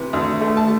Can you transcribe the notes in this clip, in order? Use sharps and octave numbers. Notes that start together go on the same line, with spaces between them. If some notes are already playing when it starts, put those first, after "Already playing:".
Already playing: C3 E3
D2
A3
A5